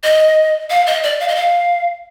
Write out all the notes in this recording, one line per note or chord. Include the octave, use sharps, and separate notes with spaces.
D#5
F5
D#5
D5
F5
D#5
F5